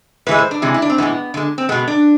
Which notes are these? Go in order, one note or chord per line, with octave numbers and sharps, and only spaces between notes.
A2 E3 G#3 B4
C5
D4
C3 E3 G#3
E4
D4
C4
A2 E3 G#3 B3
D3 G#3 A3
C4
B2 G#3 B3
D4